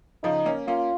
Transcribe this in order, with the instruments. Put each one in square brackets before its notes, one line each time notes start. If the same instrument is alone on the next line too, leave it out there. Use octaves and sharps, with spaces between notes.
[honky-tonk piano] C#3 F3 [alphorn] D#4
[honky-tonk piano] A#3 C#4
[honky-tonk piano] A#3 C#4 [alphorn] F4